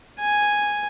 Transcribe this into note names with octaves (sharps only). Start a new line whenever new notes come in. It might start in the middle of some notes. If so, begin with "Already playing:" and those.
G#5